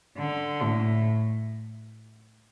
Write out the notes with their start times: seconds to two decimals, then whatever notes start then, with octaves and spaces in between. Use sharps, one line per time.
0.18 D3
0.62 A2